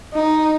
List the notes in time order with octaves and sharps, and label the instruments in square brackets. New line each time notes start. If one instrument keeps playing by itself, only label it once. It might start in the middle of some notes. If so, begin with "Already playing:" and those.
[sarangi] D#4